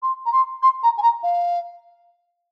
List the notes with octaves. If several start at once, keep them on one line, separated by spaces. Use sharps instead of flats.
C6
A#5
C6
C6
A#5
G#5
A#5
F5